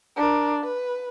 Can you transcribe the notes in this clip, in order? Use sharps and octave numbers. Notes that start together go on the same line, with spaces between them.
D4 A#4
B4